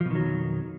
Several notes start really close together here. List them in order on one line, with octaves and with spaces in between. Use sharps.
F3 B2 D#3 F#3 F2